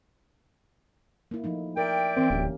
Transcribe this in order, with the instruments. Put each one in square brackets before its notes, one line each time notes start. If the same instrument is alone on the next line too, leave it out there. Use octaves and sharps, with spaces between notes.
[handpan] A#3 E4
F3 A3 D#4
[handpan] A#4 [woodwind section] D5 E5 G5
[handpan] E3 A#4 [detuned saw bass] C4
[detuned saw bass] D1 [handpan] A#3 C#4 G4